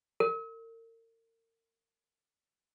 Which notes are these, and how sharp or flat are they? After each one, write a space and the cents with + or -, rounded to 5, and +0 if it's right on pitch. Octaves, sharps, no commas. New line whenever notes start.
A#4 -40